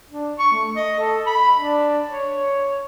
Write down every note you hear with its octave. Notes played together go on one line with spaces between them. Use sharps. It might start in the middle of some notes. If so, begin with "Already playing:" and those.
D4
C#6
A3
D#5
A4
B5
D4
C#5